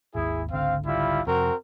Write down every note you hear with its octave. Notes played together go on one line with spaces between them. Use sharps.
G#1 D#2 E4 G#4
G#1 C#2 D3 C4 F5
G3 E4 F4
F2 C3 C4 F#4 A#4